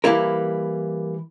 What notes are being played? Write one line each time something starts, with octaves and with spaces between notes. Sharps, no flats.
E3 G3 A#3 E4 A#4